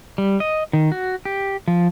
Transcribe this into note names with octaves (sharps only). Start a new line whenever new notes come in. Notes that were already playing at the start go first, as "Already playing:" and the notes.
G3
D#5
D#3
F#4
G4
F3